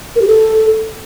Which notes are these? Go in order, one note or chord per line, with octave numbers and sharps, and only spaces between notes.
A#4
G4
A4